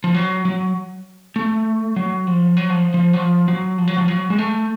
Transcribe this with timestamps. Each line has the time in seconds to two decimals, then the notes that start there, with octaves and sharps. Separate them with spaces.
0.04 F3
0.15 F#3
0.45 F#3
1.36 A3
1.96 F#3
2.27 F3
2.57 F#3
2.70 F3
2.94 F3
3.13 F#3
3.17 F3
3.48 F#3
3.78 F3
3.88 F#3
3.98 F3
4.08 F#3
4.30 G#3
4.38 A3